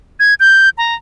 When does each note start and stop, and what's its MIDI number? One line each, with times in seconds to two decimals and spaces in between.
0.20 0.34 92
0.40 0.69 91
0.78 0.95 82